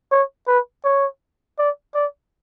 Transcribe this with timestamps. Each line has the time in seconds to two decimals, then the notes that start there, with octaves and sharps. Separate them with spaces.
0.11 C#5
0.48 B4
0.84 C#5
1.59 D5
1.95 D5